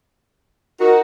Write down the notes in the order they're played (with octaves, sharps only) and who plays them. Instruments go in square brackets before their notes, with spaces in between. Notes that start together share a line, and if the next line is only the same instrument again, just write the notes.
[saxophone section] D#4 F#4 [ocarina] A#4